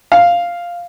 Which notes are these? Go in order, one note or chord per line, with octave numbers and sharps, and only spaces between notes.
F5